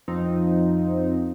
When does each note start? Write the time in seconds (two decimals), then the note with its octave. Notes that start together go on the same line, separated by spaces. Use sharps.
0.08 F2 F3 C4 D#4